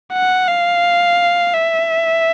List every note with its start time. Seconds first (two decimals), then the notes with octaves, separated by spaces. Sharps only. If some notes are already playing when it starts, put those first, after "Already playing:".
0.13 F#5
0.48 F5
1.53 E5